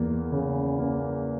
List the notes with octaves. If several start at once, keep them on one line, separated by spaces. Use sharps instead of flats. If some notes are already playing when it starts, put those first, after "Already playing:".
Already playing: E2 A#3
C#3
A#3